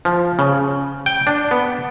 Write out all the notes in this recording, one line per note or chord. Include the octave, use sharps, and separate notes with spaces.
F3
C#3
G5
D4
B3